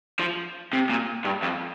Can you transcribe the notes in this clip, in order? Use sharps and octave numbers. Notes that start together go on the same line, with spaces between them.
F3
C3
A#2
G2
F2